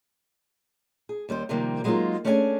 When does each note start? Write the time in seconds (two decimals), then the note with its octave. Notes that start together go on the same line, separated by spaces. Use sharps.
1.09 G#4
1.29 D#2 G3 B4 C5
1.49 C3 D#3 F3 G3 A#3
1.84 F#3 G#3 A#3 B3 D#4 F4
2.25 A3 C#4 D4 E4 G#4 G#5